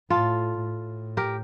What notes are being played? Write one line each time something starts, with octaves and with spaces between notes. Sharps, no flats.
A2 F4 A4
A2
G4 A#4